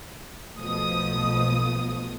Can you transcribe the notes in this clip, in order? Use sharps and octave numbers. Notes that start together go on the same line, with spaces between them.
B1 B2 F3 A3 D#6